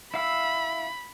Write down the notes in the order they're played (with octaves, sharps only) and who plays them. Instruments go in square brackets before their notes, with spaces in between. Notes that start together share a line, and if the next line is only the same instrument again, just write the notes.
[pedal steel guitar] E4 F5 E6 [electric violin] B5